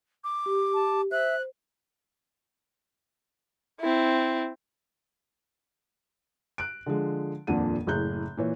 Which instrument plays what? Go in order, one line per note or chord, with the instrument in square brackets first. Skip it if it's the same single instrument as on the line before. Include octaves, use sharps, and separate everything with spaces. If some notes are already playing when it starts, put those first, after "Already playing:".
[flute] D6
[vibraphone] G4
[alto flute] A5
[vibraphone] C5 [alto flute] E5 [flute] F#6
[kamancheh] C4 E4
[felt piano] F#6 D7
D3 F3 G#3
D#1 F2 A#2 D4 F#5 D#7
F#1 A2 G#4 F#6 G6
A#2 E3 C#5